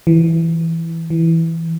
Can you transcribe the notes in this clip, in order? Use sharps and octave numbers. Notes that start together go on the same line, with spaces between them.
E3
E3